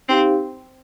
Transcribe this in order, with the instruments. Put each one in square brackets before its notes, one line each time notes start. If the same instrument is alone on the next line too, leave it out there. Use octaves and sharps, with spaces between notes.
[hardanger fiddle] C4 [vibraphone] D#4 G4 C5 F5